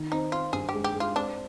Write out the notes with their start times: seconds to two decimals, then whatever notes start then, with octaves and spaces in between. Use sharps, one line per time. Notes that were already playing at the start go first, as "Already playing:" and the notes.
Already playing: D#3
0.12 C4 D#4
0.32 C4 F4
0.53 G2 G#4
0.69 G4
0.74 G#3
0.84 G4
0.94 G#3
1.00 F4
1.15 C4 D4